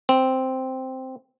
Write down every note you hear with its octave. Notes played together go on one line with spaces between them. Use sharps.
C4